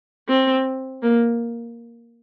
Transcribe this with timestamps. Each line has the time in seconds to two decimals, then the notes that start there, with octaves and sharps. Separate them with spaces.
0.28 C4
1.02 A#3